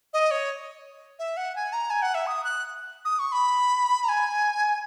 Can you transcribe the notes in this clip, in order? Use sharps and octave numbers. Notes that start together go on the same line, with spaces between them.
D#5
C#5
E5
F#5
G#5
A#5
G#5
F#5
E5
D#6
F#6
D#6
C#6
B5
A#5
G#5